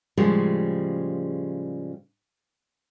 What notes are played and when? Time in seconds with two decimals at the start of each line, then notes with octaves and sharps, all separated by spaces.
0.17 A2 C#3 F3 G3 G#3